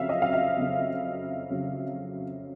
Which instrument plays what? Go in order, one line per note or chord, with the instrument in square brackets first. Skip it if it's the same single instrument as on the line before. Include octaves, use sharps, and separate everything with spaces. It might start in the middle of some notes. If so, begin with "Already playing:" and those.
Already playing: [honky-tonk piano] F2 C#3 F#3 E5 F5
D#5
F5
E5
F2 C#3 F#3
F2 C#3 F#3